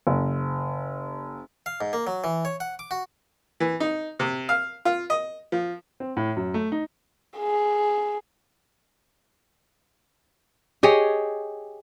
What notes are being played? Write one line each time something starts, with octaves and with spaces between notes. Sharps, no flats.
F#1
F5
G#2
A#3
F#3
E3
C#5
F#5
D6
F#4
E3
D#4
C3
F5
F4
D#5
F3
C4
A2
F#2
A3
D#4
G#4
G4 G#4 C#5 D#5